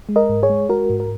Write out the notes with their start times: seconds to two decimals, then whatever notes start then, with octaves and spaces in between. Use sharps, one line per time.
0.09 G#3
0.16 A#4 D#5
0.29 G#2
0.43 G#4 C#5
0.50 G#3
0.69 G#3 F#4 A#4
0.90 G#2
1.00 A#4